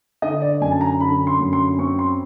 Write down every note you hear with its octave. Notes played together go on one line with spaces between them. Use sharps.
D3 D#5
D5
F#2 G#5
A5
A#5
D3 B5
C6
F#2
C6
C4 C#6
C6